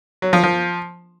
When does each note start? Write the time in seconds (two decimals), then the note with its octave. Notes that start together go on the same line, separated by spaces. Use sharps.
0.22 F#3
0.33 F3
0.44 F3